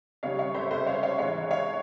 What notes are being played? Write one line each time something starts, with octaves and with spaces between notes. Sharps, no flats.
C#2 C#3 G3 C#5 F5
C#5 F5
C5 E5
C#2 C3 G3 C5 E5
C#5 F5
C#5 F5
G#2 E3 G#3 C#5 F5
C#5 F5